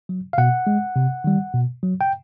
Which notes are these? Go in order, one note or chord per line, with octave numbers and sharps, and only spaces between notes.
F#3
F5
B2 F#5
G#3
C3
D#3 G3
B2
F#3
G5